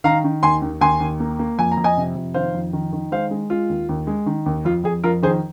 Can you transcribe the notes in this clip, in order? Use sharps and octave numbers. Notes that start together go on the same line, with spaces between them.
D#3 F5 A#5
D#3
D#2 G#5 C6
D#2
D#2 G#5 C6
D#2
A#3
A#3
F2 G#5
A#5
F2
D#5 G#5
C3
F2
D#3 C5 F5
F2
D#3
D#3
G#3 C5 F5
G#3
G#3 F4
D#2
D#2
G#3
D#3
D#2
F2 F4
F2 G#4
F2 F4 A#4
D#3 G#4 C5